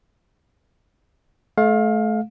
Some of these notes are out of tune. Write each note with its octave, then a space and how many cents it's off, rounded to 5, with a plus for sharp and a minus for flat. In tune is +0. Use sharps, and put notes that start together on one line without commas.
A3 -30 F5 +20